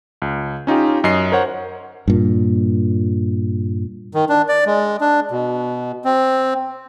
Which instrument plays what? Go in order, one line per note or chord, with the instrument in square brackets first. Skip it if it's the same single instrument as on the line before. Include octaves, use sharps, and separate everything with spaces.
[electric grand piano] C#2
C#4 D#4 F4 G4
F#2 D#5 C6 C7
A#4 C5 C#5 F#5
[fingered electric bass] G2 A#2
[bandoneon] D#3
D4
D5
G#3
D4
B2
C4